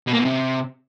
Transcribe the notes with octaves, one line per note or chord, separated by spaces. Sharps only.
B2
A#3
B2
C3